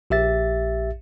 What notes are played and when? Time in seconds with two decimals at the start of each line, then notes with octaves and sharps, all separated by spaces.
0.10 A#1 G4 E5 A6